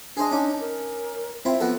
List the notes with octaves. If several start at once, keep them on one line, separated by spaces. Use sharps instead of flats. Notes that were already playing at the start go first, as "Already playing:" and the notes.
D4 G#4 C5 D#5
C#4 D#4 D6
A#4
C4 E4 F4 E5
F3 B3 F#4 A4